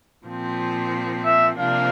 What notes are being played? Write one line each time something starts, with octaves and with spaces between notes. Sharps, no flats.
A#2 F3 C4
E5
C3 F3 A#3 D4 F5